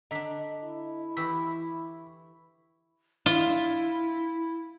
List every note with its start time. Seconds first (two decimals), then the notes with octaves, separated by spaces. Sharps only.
0.11 D3 D4 D#5 A#5 B6
0.64 E4
1.17 E3 G4 B5 C#6 E6 B6
3.26 E4 F4